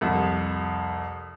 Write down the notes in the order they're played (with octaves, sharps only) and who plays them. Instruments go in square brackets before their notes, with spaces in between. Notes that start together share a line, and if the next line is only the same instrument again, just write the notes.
[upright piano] C2 F2